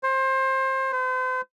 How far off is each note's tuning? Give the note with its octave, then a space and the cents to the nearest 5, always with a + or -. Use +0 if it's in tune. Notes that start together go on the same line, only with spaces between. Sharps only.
C5 +25
C5 -40